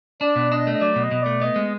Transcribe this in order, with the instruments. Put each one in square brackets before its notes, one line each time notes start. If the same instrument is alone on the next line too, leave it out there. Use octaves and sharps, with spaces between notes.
[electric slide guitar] D4 [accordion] D5
[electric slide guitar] B2
[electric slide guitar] D4 [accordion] D#5
[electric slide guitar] A3
[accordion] D#5
[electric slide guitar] F#3 [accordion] D5
[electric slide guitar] B2
[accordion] D#5
[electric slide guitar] B2
[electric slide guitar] A3 [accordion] D5
[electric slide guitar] B3 [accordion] D#5
[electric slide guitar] G#3